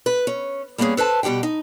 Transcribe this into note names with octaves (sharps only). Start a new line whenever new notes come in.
B4
C#4
G3 A#3 B3 C#4 G#4
A4 B4 C5 A5
B2 G3 G4 F#5 G5
D#4